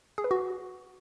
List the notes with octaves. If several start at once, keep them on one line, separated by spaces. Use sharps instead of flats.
G#4
B4
F#4